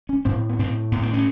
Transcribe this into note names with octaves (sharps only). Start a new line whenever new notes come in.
C#4
A2 C4
B3
A2 C4
A2 B3
C4
C#4